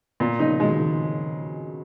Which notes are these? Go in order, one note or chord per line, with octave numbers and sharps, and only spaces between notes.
A#2
C#3 F3 D#4
B2 D#3 G#3
D#3